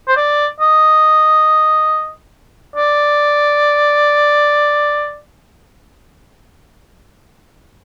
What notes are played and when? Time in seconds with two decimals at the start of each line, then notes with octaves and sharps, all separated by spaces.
0.08 C5
0.17 D5
0.60 D#5
2.76 D5